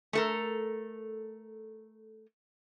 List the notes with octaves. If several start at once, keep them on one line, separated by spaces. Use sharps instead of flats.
A3 A4 A#4